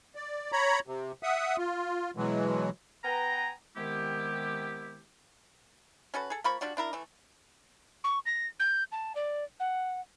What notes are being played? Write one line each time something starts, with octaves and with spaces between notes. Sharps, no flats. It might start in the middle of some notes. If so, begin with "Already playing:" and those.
D5
C#5 A#5 B5
C3
E5 F#5 D#6
F4
B2 E3 F#3 G#3
B3 B4 G5 G#5 A#5
C3 D#3 G#3 B3 E4 G4
C#4 F#4 A4 B4
G#4 A4
F3 A#3 B5 C#6
G3 D4 F4 F#4
D4 E4 A#4
E3 A3
C#6
A#6
G6
A5
D5
F#5